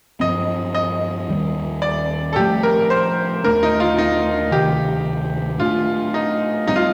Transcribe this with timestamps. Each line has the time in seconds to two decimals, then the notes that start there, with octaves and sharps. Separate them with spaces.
0.20 G2 F3 C4 D#5
0.75 D#5
1.29 D#2 D#3 G3
1.82 D5
2.33 A4
2.36 A2 F3 A3 G4
2.63 A#4
2.90 C5
3.44 D#2 D3 A3 D4 A#4
3.63 D#4
3.80 F4
3.98 D#4
4.52 D2 C3 D#3 G4
5.60 A2 A3 D4 F4
6.14 D#4
6.67 A2 G3 C4 D#4
6.76 F4